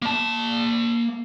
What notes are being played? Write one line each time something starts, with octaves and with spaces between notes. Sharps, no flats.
A#3 A5